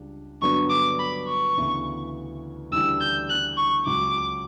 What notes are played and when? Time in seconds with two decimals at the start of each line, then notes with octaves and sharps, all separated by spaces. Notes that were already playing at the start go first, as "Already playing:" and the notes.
Already playing: C#2 C#3 G3 D4
0.41 G2 D3 F#3 B3 D4 C#6
0.70 D6
0.99 B5
1.28 C#6
1.57 D2 C#3 E3 B3 E4
2.71 D2 C#3 E3 G3 D4 E6
3.01 G6
3.30 F#6
3.57 C#6
3.86 C#2 C#3 F#3 D6